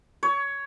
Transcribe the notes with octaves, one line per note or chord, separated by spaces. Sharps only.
C#5